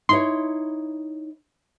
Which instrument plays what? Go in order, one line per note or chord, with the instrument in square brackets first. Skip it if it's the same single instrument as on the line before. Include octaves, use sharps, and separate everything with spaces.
[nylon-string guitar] D#4 E4 C#5 [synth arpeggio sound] C6